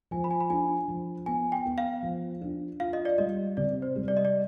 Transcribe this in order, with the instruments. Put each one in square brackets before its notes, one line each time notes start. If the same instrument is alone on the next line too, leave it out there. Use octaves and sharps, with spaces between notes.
[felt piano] F3 [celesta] G#5
[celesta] B5
G#5
B5
[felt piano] D4 [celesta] G#5
[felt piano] F3
[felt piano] B3 [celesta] G#5
[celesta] G5
[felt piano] B3
[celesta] F5
[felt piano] F3
D4
[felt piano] F4 [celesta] F5
[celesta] D#5
D5
[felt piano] G3 [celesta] D#5
[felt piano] C3 [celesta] D5
[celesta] C5
[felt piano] G3
[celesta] D5
D#5
D5